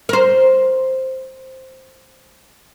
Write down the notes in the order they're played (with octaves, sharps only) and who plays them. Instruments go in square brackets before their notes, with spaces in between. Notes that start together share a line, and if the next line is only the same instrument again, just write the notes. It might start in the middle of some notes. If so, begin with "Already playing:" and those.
[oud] A#4 C5